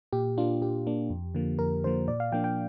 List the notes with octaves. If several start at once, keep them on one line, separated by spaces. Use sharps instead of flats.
A#2 G4
A#3 D4 F4
A#2 G4
A#3 D4
F2
D3 F3 A#3
F2 A#4
D3 F3 A#3 C5
A#2 D5
F5
F3 A#3 D4 G5
G5